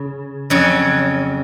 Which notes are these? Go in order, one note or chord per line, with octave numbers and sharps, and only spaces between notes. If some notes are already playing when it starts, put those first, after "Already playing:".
Already playing: C#3
F2 C#3 F#3 C#4